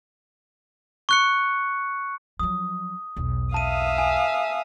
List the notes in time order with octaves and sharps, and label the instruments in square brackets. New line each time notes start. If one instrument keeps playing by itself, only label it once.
[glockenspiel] C#6 F#6 C#7
[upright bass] F3 F#3 [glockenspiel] D#6
[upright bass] B1 E2
[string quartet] E5 F5 D#6 [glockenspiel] A5 D#7
[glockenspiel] G#5